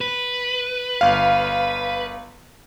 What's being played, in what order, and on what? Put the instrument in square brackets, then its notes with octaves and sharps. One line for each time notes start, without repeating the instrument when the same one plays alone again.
[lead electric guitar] B4
[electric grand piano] G1 F5